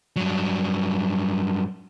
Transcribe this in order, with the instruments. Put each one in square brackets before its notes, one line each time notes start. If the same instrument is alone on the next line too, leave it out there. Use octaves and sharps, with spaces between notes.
[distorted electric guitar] G2 F#3